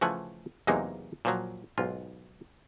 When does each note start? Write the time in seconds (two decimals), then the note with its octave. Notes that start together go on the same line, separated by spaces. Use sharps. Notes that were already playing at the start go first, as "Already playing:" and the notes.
0.01 C#3 E3 F3 A3 F#5 G#5
0.67 E2 C3 F#3 G#3 A#3 D#4
1.25 A#2 F3 F#3
1.78 B1 G#2 F4